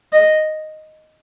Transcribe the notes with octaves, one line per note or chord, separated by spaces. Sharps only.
D#5